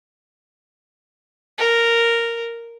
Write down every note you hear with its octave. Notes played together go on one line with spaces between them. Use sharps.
A#4